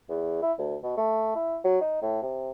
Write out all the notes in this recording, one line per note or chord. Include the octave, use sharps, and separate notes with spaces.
E2
E4
D2
B2
A3
E4
F#3
D#4
A2
C3